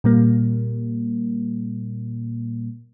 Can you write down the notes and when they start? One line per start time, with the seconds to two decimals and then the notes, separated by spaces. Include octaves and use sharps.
0.04 A#2 G3 A#3